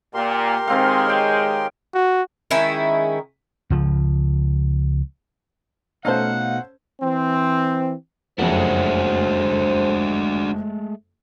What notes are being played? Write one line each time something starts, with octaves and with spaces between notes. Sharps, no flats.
A#2 A#3 G4 A#4 C6
D#3 G#3 C4 F5
C#5 G5
F#4
D#3 G#3 C#4 E4
C#2 F3
B2 A3 C#4 D#4 A4 C5 F5 F#5
E3 C4
F#1 F2 G#3 A3 D4 F#4 C5